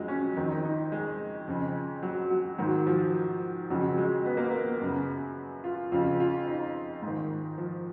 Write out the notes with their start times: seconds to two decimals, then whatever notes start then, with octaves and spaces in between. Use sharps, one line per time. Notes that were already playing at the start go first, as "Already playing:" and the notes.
Already playing: F2 C#3 F3 F#3 G#3
0.08 C#4
0.37 F2 D#3 D#4
0.51 D#4
0.65 D#4
0.92 G#3
1.48 F2 C#3
2.03 F#3
2.30 F#3
2.58 G#2 D#3 F#3
2.87 F3
3.70 F2 C#3 F#3
3.98 G#3
4.26 B3
4.37 A#3
4.50 B3
4.81 F#2 C#3
5.64 F4
5.92 F2 C#3 F4
6.20 F4
6.47 D#4
7.02 G#2 D#3
7.58 F3